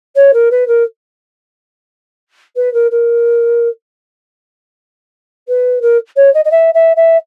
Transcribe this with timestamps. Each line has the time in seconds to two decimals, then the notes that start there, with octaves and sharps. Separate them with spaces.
0.16 C#5
0.33 A#4
0.51 B4
0.67 A#4
2.56 B4
2.73 A#4
2.91 A#4
5.48 B4
5.81 A#4
6.16 C#5
6.33 D#5
6.44 D#5
6.51 E5
6.74 E5
6.96 E5